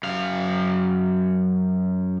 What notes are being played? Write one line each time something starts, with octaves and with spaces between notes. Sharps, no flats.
F#2 F5